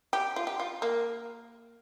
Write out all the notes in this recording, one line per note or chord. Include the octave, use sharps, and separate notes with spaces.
G4
F4
G4
F4
A#3